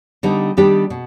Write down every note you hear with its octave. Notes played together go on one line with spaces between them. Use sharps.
D3 G3 B3 D#4
D#3 G3 B3 D4 G4
B2